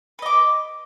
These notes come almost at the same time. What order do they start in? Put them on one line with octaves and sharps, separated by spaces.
B4 D#5 D6